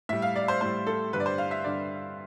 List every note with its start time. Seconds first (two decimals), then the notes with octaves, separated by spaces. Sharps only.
0.09 A2 G3 E5
0.22 F5
0.36 D5
0.48 C5
0.61 A2 G3 C5
0.87 A4
1.13 G2 D3 G3 B4
1.20 D5
1.26 C5
1.38 F5
1.51 E5
1.64 G2 D3 G3 D5